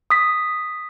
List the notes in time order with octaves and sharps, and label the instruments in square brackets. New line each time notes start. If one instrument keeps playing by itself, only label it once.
[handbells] D#6 B6